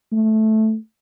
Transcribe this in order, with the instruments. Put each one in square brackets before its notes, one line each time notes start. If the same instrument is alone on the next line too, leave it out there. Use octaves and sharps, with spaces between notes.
[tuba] A3